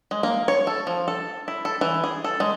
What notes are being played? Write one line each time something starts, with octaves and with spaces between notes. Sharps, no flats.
G#3
A#3
C#5
A4
F3
A4
E4
A4
E3
G#4
A4
G#3